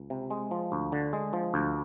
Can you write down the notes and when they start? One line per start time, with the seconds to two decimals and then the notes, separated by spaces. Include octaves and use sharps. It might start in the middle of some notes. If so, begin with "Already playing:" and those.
Already playing: C#2
0.10 C3
0.30 G#3
0.51 F3
0.72 D2
0.92 D3
1.13 G#3
1.33 F3
1.54 D2